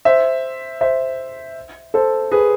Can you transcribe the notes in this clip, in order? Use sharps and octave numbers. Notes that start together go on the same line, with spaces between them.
C5 E5
C5 E5
A4 C5
G#4 B4